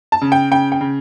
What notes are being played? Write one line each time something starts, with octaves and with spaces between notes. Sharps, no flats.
A5
C#3
G5
C#3 G5
G5
C#3